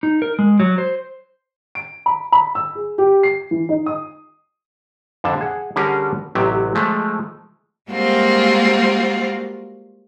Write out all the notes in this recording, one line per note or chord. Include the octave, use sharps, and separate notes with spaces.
D#4
A#4
G#3
F#3
C5
D7
B5
B5
E6
G#4
G4
C7
E3
D#4
D#6
F2 D3 A5
G#4 F#5
D3 G3 C#4 F#4 G#4 A#4
A1 C3 F#3 G4
F3 G#3 A3
G3 G#3 A#3 C4 F4 F#4